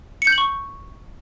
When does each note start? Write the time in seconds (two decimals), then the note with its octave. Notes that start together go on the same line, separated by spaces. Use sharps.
0.22 C#7
0.27 G6
0.33 F#7
0.38 C#6